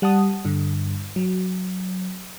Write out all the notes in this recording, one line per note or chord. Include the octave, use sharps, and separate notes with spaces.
G3 F#5 A5 D#6
G2 D3
F#3